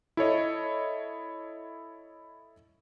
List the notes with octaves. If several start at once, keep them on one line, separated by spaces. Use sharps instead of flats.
E4 A4 C#5 D#5